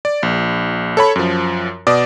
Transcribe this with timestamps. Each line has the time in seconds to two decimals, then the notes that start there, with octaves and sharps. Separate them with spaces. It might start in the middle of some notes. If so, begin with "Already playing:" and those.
0.05 D5
0.23 A#1
0.97 A4 C#5 B5
1.16 F#2 F3
1.87 B2 D5 D6 D#6